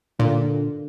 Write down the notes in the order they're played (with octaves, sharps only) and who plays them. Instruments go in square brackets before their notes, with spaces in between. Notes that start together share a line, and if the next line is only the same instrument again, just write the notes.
[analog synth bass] A#2 [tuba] D3